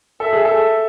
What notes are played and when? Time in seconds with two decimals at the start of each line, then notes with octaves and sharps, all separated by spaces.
0.20 A4 E5
0.33 G#4
0.45 A4